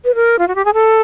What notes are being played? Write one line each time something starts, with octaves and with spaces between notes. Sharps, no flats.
B4
A#4
F4
F#4
G4
G#4
A4